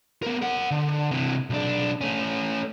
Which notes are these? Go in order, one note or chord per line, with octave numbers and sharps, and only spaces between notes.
B3 A#4
A#4 F#5
D3
C3 E3
B1 D4
A3 C#4